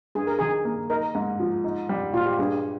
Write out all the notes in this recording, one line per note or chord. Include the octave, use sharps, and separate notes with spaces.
G2 G#4
A#4
D#3 G#4
A#3
D#4 A#4
G#2
F3
D#4
G3
A#2 F4
G4
G2 G#4